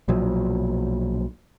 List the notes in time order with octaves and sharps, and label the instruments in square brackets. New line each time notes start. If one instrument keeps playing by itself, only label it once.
[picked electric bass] B1 A#2 F3 F#3